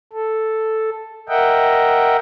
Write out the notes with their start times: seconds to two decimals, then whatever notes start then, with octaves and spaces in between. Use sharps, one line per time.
0.13 A4
1.29 A#4 D#5 E5 F#5 G5